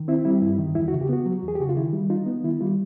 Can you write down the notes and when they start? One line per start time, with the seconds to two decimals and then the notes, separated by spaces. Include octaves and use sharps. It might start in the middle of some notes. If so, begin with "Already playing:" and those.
Already playing: D#3
0.08 C4 E4
0.25 G3 E4
0.42 G2 E4
0.58 D#3
0.75 E2 E4
0.88 F#4
0.93 C#3
1.01 G4
1.09 B3 F#4
1.26 F#3
1.43 E2 G#4
1.55 G4
1.60 C#3 F#4
1.69 F4
1.77 D#3 E4
1.93 G3
2.10 D#4 F4
2.26 B3
2.44 D#3 E4
2.61 G3 F4